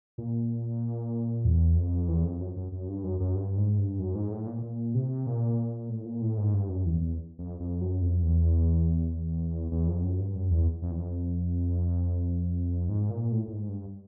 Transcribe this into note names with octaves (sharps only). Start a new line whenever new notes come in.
A#2
E2
F2
E2
F2
F#2
F#2
F#2
G2
F#2
F#2
G2
G#2
G2
F#2
G#2
A2
A#2
A#2
C3
A#2
A2
A#2
A2
G#2
G2
F#2
E2
E2
F2
F2
F#2
F2
E2
E2
F2
F#2
G2
F#2
E2
F2
E2
F2
G#2
A#2
A2
A2
G#2
G2